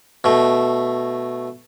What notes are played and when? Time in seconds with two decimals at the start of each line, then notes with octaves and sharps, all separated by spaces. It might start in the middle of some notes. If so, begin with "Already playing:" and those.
0.24 B2 A3